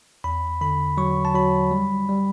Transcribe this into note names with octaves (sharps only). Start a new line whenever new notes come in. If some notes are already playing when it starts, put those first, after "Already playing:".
E2 B5
D3 B5
F#3 C#6
A5
F#3 B5
G3
G3